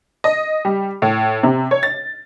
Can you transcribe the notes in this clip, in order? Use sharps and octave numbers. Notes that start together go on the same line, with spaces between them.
D#5
G3
A2
C3
C#5
A6